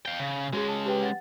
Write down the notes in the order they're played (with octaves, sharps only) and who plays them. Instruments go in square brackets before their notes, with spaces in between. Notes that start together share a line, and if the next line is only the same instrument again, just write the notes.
[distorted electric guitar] F5 G5
C#3
[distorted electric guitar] G#3 C#4 [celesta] F#4 G#4
[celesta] A5
G4 B4 G5
F#5 A6